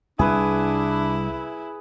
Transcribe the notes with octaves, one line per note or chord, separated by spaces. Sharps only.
C2 D4 E4 G#4 B4